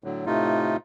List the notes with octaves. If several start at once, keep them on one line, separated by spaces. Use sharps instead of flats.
A2 D3 F#3
A2 C3 A3 D#4 F4